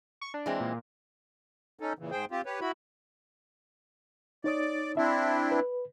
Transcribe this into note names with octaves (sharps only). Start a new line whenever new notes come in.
C#6
D4
E3 G#3 C4
A#2
C#4 D#4 A4
A#2 C#3 E3
G#2 G#4 C5 G5
C4 F4 G4
G4 B4 C#5
E4 F#4 B5
D#4 C#5 D5 D#6
C4 D4 E4 E5
B4